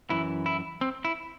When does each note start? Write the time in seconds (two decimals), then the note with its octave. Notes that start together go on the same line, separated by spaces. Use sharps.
0.10 F#2 E3 E4
0.46 E4
0.81 C4
1.05 E4